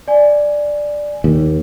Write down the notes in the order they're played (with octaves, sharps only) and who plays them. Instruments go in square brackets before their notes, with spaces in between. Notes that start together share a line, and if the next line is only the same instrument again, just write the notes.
[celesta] D5 G#5
[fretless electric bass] D#2